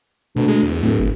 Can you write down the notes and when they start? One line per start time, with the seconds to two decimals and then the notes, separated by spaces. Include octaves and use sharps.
0.36 D2 B2
0.48 G#3
0.63 E2
0.83 D1 A2
1.00 G1